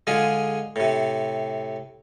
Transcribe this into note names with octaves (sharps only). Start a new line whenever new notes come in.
D3 G#3 F4 G#4
A2 C3